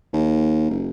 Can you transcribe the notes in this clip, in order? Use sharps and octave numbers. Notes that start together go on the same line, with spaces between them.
D#2
F#1